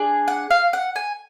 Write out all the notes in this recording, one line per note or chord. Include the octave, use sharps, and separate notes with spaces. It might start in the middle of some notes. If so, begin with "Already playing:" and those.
Already playing: D4 G#4
F#5
F5
F#5
G#5